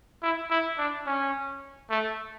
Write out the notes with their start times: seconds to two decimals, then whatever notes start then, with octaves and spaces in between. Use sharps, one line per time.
0.22 E4
0.50 E4
0.78 D4
1.06 C#4
1.90 A3